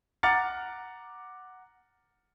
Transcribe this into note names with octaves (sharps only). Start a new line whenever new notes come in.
F#5 A#5 D6 F6 A6 C#7